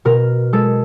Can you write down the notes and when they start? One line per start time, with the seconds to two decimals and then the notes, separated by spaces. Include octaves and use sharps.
0.05 B2 A#4
0.53 G#3 A4